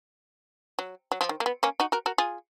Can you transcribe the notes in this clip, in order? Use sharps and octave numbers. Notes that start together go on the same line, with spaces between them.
F#3
F#3
F3
D#3
A#3
B3
A#3 C#4
D#4 F#4
F#4 A#4
F#4 A#4
F4 G#4